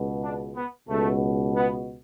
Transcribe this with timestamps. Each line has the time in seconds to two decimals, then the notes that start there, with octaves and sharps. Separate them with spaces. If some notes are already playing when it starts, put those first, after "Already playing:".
Already playing: C#2 B2
0.21 D4
0.55 B3
0.88 C#2 B2 A3
1.56 B3